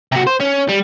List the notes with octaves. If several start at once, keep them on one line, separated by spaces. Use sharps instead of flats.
C3 F#4
C5
C#4
G3